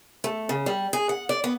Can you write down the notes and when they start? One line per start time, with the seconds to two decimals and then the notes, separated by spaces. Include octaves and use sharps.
0.24 A3
0.49 C#3
0.66 G3
0.93 G#4
1.09 F#5
1.29 D5
1.44 B3